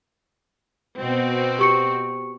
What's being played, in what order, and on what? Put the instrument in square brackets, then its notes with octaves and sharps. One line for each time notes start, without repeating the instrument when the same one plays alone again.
[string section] B2 C4 F#4
[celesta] G4 C#6 C#7